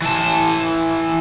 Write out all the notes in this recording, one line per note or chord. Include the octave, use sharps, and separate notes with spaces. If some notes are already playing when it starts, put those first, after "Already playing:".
E3 A5